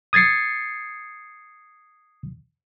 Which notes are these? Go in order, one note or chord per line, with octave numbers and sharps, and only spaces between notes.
D#6 G#6 A6 C7 C#7